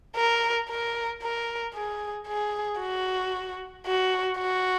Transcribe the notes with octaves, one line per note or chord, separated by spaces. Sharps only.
A#4
A#4
A#4
G#4
G#4
F#4
F#4
F#4